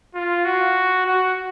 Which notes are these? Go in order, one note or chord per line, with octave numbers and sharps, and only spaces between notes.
F4
F#4
F#4